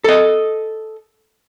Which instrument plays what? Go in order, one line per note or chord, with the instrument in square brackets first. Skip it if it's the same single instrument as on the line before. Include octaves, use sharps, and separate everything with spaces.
[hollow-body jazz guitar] A4 D#5